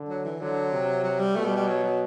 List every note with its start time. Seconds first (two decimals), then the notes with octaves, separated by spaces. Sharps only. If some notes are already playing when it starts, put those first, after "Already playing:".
Already playing: D3
0.09 F#3
0.25 E3
0.40 D3 F#3
0.71 C3
1.04 F#3
1.20 G3
1.35 B2 A3
1.46 G3
1.57 G3
1.68 F#3
1.84 F#3